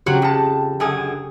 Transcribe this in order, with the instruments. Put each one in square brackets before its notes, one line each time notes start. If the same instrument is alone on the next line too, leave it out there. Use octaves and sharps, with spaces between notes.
[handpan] C#3 G4 [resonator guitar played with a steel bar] F#3 C4 F#4
[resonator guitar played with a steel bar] F2 A5
F#2 D3 G#4